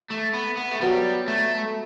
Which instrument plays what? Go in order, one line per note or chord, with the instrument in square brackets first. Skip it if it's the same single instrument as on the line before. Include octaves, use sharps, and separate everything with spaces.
[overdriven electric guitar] A3
B3
B3
A3
[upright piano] F#3 B3 F#4 [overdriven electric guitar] G3
[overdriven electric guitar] A3